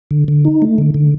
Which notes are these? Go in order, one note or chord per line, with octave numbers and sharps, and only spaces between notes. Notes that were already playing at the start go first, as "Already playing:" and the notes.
D3
D3
D#4
A3
D3
D3